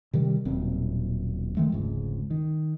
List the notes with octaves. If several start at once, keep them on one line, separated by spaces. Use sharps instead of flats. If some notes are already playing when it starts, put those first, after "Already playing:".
C3 D#3 G3
D#1 B1 A#2 C4
D#3 G#3 A3
F1 C#2 G#2
D#3